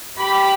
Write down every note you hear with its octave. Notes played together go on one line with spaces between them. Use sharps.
G4 B5